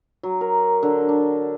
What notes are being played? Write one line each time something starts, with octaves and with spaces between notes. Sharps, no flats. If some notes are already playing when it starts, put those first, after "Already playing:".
F#3
A#4
D3
D4